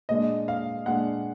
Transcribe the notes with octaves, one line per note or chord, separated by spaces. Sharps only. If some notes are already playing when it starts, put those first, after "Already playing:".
A#2 G#3 D4 D#5
F5
A#2 G#3 D4 F#5